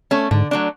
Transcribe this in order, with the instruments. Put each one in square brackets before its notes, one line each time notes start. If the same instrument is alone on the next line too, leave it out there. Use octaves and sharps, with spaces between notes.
[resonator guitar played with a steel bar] A3 C#4
[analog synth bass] G#2 [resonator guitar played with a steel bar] D3
[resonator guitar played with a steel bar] F#3 A3 D4